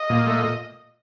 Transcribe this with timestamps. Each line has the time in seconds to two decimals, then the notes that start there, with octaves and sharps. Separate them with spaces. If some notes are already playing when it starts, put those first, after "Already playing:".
Already playing: D#5
0.10 A#2
0.27 A3